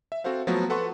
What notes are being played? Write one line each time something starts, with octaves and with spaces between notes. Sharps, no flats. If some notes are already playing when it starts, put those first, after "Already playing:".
E5
C4 F#4 A4 C5 F5
F3 F#3 A3 B3 F#4 A4
A4 B4 F#5 C6 C#6